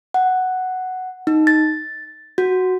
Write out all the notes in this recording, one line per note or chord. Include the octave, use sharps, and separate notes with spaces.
F#5
D#4
A6
F#4